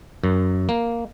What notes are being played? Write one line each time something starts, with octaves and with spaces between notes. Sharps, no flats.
F#2
A#3